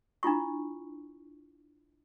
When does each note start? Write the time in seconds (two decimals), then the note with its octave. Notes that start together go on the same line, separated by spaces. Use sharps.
0.23 D4 E4 F4 C#6